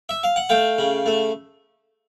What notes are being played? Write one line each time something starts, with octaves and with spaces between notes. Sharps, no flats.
E5
F5
F#5
A3 F5 G5
C#3
A3